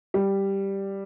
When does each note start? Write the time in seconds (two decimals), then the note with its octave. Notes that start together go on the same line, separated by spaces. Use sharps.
0.14 G3